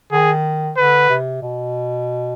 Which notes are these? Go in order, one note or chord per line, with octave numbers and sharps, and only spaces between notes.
D#3 G#4
D3 B4
C3
B2